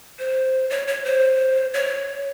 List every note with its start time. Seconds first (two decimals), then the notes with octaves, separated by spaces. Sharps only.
0.19 C5
0.70 C#5
0.88 C#5
1.04 C5
1.74 C#5